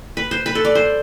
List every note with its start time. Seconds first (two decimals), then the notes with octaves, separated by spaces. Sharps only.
0.17 B4
0.31 C5
0.46 B4
0.55 A4
0.65 D5
0.75 C5